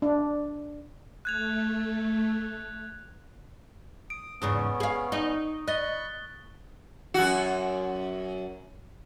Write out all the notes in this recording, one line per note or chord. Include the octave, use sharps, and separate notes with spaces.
D4
A3 F#6 G#6 F7
D#6 D7
E2 G#2 C#3 B3 C#4 C#6 D#6
G#4 F5
D#4
D#5 B5 C#6 F#6 A6 G7
F#2 F#4